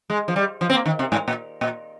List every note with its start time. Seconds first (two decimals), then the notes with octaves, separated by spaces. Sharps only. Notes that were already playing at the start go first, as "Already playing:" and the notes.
0.10 G#3
0.28 F3
0.36 G3
0.61 F3
0.70 C4
0.73 A#3
0.86 D#3
0.99 C3
1.12 G#2
1.28 A#2
1.61 A#2